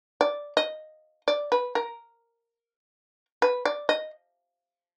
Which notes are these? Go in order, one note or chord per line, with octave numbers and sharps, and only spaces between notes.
D5
D#5
D5
B4
A#4
B4
D5
D#5